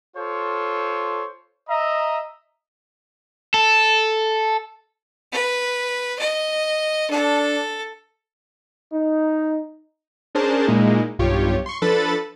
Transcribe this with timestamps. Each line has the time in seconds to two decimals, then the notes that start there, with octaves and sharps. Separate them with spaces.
0.17 F4 A4 C5 C#5
1.69 D#5 E5 A#5
3.54 A4
5.32 B4
6.19 D#5
7.10 D4 A4
8.92 D#4
10.35 C#4 D4 G#4 A#4 C5 A5
10.67 A#2 G#3 A#3 D#4 E4
11.19 B1 G2 F4 G4 C#5
11.66 C6 C#6
11.82 F3 D4 A4 B4 B5 A6